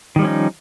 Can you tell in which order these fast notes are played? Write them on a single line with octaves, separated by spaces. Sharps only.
D#3 G3 F3 C#4 D#4